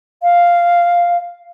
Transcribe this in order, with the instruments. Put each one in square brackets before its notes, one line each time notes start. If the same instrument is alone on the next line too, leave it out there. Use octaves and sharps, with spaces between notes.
[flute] F5